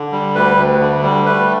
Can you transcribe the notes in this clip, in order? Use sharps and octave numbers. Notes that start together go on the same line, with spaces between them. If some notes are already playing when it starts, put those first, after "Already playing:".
Already playing: D3
G3
D2 B4
D2
D3
G3
A3 B4